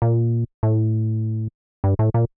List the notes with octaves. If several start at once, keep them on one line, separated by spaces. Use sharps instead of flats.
A#2
A2
G2
A2
A#2